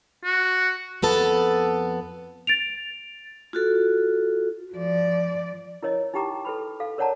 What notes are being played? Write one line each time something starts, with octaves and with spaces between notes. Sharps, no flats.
F#4
F2 B3 A4 A5
A6 D7 F7
F4 F#4 A4
F3 D5
E4 A#4 C#5 D#5
D#4 E4 G4 G5 A#5 D6
A4 B4 B5
A4 F5
A#4 C#5 D5 F#5 A5 A#5